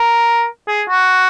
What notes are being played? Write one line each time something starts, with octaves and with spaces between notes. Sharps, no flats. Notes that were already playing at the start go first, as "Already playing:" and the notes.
Already playing: A#4
G#4
F#4